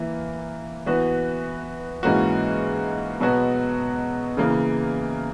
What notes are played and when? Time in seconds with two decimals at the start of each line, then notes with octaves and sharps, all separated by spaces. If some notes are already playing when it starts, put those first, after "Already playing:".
Already playing: E3 A#3 E4
0.86 E3 B3 F#4 B4
2.03 G#2 E3 A#3 C#4 F#4
3.20 B2 F#3 B3 F#4
4.37 C#3 E3 A#3